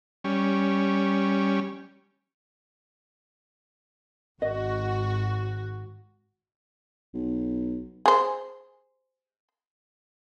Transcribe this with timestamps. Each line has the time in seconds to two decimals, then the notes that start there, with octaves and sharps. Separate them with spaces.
0.24 G3 C#4
4.42 G#1 F#4 D#5
7.14 B1
8.06 G#4 C5